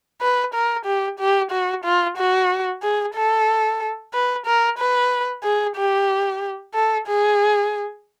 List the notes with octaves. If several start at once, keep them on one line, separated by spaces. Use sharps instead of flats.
B4
A#4
G4
G4
F#4
F4
F#4
G#4
A4
B4
A#4
B4
G#4
G4
A4
G#4